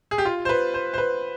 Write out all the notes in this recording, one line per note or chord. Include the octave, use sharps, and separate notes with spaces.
G#4
G4
F4
C5
B4
C5
C5
B4